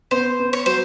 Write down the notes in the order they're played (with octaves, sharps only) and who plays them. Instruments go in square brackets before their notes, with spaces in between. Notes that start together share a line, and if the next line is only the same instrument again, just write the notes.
[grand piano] B3 [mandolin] C5
[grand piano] B3
[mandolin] C#5
[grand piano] F#3 [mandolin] C5